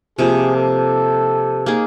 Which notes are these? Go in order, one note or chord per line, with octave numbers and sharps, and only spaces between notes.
C3 F3 A#3 G#4
A4
A#3 D#4 G#4